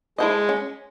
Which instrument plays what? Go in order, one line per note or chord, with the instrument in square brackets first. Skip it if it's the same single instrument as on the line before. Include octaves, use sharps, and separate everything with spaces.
[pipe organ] G#3 [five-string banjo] E4 A4 C5 D#5
[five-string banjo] C#4